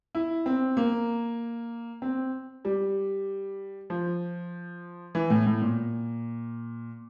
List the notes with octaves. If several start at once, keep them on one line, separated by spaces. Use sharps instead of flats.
E4
C4
A#3
C4
G3
F3
E3
A2
A2
A#2